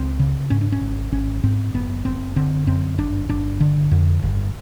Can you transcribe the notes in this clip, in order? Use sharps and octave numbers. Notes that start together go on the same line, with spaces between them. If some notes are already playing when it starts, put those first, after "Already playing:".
Already playing: C#2 C4
C#3
G#2 C#4
D4
C#4
G#1
G#1 C#4
G#2 C4
F#1 B3
F#1 C4
D3 C4
F#2 C4
G1 D4
G1 D4
D3
F2
G1